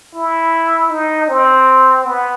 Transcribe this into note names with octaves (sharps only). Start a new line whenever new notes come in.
E4
D#4
C4
B3